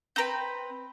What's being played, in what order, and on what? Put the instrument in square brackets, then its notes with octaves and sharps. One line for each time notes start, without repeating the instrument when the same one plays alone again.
[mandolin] C4 B4 [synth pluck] G5 A#5 G6